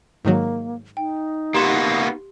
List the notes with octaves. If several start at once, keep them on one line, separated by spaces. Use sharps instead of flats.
G#2 D#3 F#3 A#3
D#4 G5
A#3 B3 F#4 G4 C6 E7